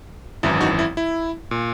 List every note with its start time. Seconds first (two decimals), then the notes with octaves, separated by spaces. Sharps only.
0.43 G#1 F#2 E3 E4
0.61 D#4 F#4
0.79 E4
0.97 E4
1.51 A#2